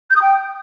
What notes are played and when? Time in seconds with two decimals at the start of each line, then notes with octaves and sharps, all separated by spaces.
0.10 G6
0.15 D#6
0.21 G5